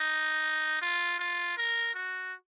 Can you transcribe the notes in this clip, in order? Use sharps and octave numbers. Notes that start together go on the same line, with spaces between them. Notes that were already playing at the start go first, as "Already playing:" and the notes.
Already playing: D#4
F4
F4
A#4
F#4